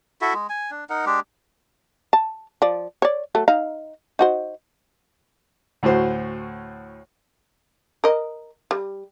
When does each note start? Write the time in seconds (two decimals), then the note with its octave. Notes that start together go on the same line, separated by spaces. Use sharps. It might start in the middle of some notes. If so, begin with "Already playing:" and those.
0.21 E4 F#4 A4 E5
0.34 G#3
0.49 G#5
0.71 D4
0.90 D#4 A#4 F#5
1.06 G#3 D4 G4
2.13 A5
2.62 F3 D5
3.02 C#5 D5
3.35 F#3 A3 A4
3.48 D#4 F5 A#5
4.19 D#4 F#4 C5
5.83 D2 A2 F#4 C5
8.04 A#4 D#5
8.71 G3